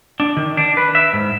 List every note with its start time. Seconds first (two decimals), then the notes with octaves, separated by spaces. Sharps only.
0.20 D4
0.37 D#3
0.57 D4
0.77 B4
0.95 E5
1.13 G#2